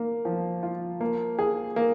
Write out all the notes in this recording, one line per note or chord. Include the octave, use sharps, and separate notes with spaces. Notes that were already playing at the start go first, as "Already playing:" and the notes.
Already playing: A#3
F3
F4
A#3
G#4
A#3